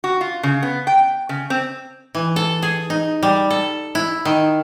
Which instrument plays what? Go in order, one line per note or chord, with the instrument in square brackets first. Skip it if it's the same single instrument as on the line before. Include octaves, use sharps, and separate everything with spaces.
[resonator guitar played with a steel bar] F#4
F4
C#3
B3
G5
C#3
C4
[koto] E3
A4
G#4
D#4
G3
A4
E4
D#3